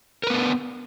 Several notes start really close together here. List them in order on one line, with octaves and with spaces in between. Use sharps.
A#4 B4 B3 D4